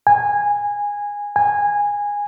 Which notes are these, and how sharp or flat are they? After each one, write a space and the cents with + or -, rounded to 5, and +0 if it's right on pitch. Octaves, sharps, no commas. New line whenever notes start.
G#5 -15
G#5 -15